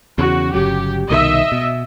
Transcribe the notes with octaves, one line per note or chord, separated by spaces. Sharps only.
E2 C#3 F#4
G1 C#3 F#3 G4
C2 B2 D#3 D#5 E5
B2